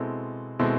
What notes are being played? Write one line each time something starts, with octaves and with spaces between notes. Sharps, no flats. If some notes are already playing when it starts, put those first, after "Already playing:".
Already playing: B2 G#3 C4 E4 A4
B2 G#3 C4 E4 A4